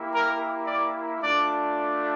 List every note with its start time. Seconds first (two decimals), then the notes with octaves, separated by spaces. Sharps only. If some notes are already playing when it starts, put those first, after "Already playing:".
Already playing: A#3 E4 G4
0.13 A#4
0.67 D5
1.21 A3 D4 F4 D5
1.74 D5